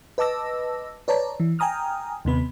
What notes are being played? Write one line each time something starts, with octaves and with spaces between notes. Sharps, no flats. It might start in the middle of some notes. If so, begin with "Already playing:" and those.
B4 D#5 A5 D6 E6 A#6
B4 C#5 D5 A5 A#5
E3
G5 G#5 A#5 D#6 F6
D#2 C3 B3 B5